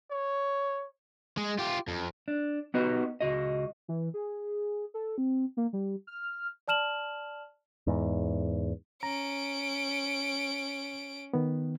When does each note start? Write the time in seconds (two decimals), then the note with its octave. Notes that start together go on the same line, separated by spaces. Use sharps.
0.11 C#5
1.37 G#3
1.58 F4 G4
1.88 F2
2.28 D4
2.74 B3 D#4 F#4 G4 B4 D#5
3.21 C#2 F#4 D#5
3.88 E3
4.14 G#4
4.94 A4
5.18 C4
5.57 A#3
5.73 G3
6.07 F6
6.68 D5 A5 F6 E7 F#7
7.87 E2 G#2
9.03 C#4 A#5 D7
11.33 D#3 B3